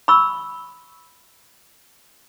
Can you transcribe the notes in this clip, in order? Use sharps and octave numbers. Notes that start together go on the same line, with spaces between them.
B5 C#6 E6